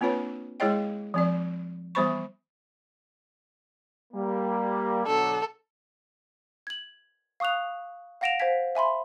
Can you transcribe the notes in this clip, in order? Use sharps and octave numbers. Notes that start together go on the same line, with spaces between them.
A#3 C4 D4 F4 B4 C#5
G#3 E4 G#4 C#5 D#5 G5
F3 C4 D5
E3 G3 B3 C5 B5 C#6
G3 A#3
B2 D3 F#3 A4
G#6 F#7
F5 C#6 D#6 F#6 F7
F5 F#5 A#6 D7 E7 F7
C5 F5 G#5 G#6 B6
E5 G#5 B5 C6